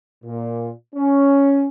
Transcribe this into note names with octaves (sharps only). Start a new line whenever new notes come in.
A#2
C#4